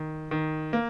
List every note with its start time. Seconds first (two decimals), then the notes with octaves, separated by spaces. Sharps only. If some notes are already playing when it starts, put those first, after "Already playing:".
Already playing: D#3
0.31 D#3
0.73 A#3